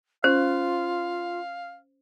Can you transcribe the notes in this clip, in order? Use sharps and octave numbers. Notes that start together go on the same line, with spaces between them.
C#4 F4 C5 F5